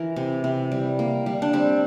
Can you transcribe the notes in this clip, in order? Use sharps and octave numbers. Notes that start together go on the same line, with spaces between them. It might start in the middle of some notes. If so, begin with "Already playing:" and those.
Already playing: E3 A#4
C3
C3
G3
A#3
G3
D4
G3 C4